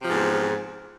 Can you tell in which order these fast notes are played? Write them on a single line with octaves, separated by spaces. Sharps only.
C3 F3 G#2 E2